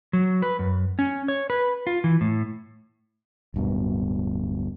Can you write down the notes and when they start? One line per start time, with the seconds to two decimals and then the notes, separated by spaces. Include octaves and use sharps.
0.13 F#3
0.42 B4
0.59 F#2
0.99 C#4
1.28 C#5
1.50 B4
1.87 F4
2.04 E3
2.21 A2
3.54 D1 G2 B2